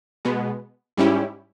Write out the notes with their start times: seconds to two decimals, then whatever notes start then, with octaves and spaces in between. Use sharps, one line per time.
0.25 B2 G#3 B3
0.97 G#2 G3 C#4 E4 G4